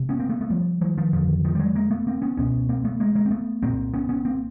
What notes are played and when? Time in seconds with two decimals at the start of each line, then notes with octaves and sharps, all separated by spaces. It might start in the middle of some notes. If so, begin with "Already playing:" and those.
Already playing: C3
0.09 B3 C#4
0.19 A#3 C4
0.29 A3 B3
0.41 A3 B3
0.50 F3 G3
0.81 E3 F#3
0.97 D#3 F3
1.13 F2 D3 D#3 F3
1.45 D#3 F3
1.55 G3
1.59 F#3 G#3
1.75 G#3 A#3
1.91 A3 B3
2.07 A#3 C4
2.22 B3 C#4
2.37 C#2 B2 B3 C#4
2.69 A#3 C4
2.85 A3 B3
3.00 G#3 A#3
3.15 G#3 A#3
3.26 C4
3.31 A3 B3
3.62 C2 A#2 A#3 C4
3.93 B3 C#4
4.09 B3 C#4
4.25 A#3 C4